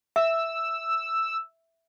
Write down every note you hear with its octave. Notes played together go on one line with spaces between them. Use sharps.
E5 E6